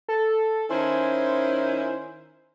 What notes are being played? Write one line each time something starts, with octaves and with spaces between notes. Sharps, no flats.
A4
D#3 C#4 E4 C5